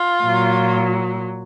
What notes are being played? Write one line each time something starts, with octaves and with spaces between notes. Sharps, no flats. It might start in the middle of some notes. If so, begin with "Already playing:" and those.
Already playing: F4
A#2 F#3